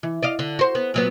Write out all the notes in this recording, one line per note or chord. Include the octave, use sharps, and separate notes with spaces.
E3
D5 D#5 F5
D3
F#4 C5
B3
A#2 F#3 B3